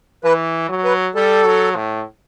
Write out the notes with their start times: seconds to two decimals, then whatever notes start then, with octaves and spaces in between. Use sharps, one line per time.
0.24 E3 B4
0.69 F#3
0.84 B4
1.15 G3 A4
1.45 F#3
1.76 A2